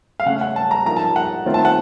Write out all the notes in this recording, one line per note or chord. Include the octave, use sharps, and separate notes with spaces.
F5
C#3 A3 C#4 F#5
F#5
A5
A#5
F3 A#3 D#4 A#5
A5
F#5
D#3 A3 C4 F4
A5
F#5